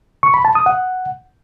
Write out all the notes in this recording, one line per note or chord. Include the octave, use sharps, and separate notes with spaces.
C#6
B5
A5
D#6
F#5